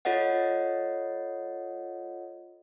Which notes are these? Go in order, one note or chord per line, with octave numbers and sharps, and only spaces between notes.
F4 A4 C#5 D#5 F#5